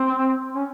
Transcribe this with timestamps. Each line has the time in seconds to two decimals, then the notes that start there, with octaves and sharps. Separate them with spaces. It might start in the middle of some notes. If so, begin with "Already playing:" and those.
Already playing: C4
0.55 C#4